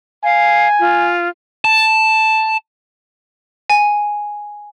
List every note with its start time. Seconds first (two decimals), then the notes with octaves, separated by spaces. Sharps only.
0.24 F5 G#5
0.80 F4
1.65 A5
3.70 G#5